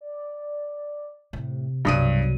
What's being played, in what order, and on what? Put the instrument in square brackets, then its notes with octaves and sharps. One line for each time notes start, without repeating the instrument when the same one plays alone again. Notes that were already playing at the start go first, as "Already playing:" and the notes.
[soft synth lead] D5
[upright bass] A2 [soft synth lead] C3
[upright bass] C2 B2 [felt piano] G2 D#6 D#7 [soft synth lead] F#3